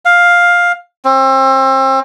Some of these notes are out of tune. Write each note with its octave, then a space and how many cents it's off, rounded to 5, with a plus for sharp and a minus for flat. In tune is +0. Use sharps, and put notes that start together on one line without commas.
F5 +10
C4 +35